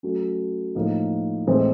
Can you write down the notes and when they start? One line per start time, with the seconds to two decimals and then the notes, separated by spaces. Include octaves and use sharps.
0.03 F#3 A3 C#4
0.75 A2 F3 A#3 D#4
1.47 A2 E3 G#3 C4